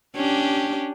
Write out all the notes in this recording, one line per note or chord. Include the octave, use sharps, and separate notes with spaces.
C#4 D4 G4